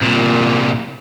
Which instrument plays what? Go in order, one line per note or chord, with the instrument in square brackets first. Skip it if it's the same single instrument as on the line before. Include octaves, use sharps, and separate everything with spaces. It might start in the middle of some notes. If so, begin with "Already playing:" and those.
[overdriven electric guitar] C2 A#2